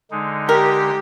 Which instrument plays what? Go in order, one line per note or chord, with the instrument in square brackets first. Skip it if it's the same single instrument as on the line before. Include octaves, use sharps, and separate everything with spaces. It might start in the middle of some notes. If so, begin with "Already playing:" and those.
[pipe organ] D3 G#3 D#4
[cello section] G4 [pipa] A#4